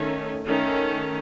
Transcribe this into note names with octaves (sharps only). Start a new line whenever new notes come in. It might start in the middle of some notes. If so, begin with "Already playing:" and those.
Already playing: D#3 A3 C#4
D#3 A3 C#4